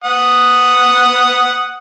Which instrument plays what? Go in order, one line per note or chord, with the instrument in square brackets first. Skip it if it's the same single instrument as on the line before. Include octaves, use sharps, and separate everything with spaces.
[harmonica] F#5 D#6